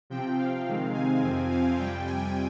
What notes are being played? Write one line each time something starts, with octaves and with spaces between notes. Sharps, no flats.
C3 F3 C4 G5
F5
C3 D#3 G#3 C4
G#5
F2 C3 F3 C4
F5
F2 C3 G3 G5
G#5